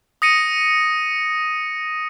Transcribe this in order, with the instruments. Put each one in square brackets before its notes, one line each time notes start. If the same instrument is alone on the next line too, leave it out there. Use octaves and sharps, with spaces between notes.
[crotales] D#6 A#6 C#7 D#7